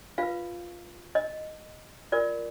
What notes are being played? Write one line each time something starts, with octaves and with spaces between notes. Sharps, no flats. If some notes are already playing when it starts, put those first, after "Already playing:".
F4 B4 F5
D#5
F4 A#4 D5